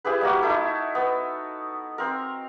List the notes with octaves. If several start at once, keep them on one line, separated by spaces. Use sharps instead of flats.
E4 G4 G#4 B4
G3 A#3 F#4
D#4 E4 A4
B3
C4 A#4